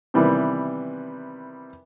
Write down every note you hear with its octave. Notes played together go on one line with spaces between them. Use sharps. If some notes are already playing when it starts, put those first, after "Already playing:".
C3 D#3 E3 G3 B3